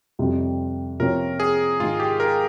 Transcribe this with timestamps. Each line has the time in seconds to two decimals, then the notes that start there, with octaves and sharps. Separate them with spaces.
0.19 F2 C3 G3
0.99 C3 F3 A#3 C#4 F4 A#4
1.40 G#4
1.80 G#2 D#3 G#3 F4
2.00 G4
2.20 A#4